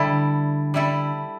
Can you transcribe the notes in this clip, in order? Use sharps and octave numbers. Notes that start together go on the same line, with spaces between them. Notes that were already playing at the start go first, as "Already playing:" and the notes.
Already playing: D3 G3 E4 A4
G3 E4 A4